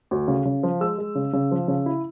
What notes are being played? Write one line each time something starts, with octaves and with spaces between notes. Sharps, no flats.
D2
C#3
C#3
F3
G#3 E6
G#3
C#3
C#3
F3
C#3
E4